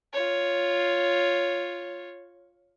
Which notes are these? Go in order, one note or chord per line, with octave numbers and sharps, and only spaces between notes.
F4 C#5